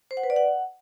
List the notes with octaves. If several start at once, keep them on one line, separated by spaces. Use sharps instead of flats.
C5
F#5
B4
D5
F#5